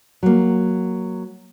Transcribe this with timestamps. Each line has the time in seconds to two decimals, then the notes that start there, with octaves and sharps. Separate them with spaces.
0.23 F#3 A#3